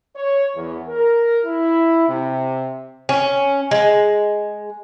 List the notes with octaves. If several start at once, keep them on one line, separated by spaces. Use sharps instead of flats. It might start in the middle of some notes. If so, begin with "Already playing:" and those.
C#5
E2
A#4
E4
C3
C#4
G#3